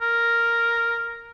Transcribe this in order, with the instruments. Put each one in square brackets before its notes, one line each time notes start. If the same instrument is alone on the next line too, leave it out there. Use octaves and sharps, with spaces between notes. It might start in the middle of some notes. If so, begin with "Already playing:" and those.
[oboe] A#4